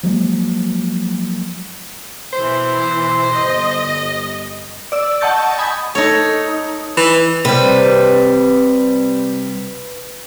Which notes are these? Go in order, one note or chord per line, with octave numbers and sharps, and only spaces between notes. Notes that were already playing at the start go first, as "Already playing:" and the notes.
F3 F#3 G#3 A#3
B2 E3 C5
G1 D#5
D5 E6
D#5 F#5 A5 C#6 G6 A6
G#5 B5 D#6
D#4 A4 C#5
E3
C3 G3 B4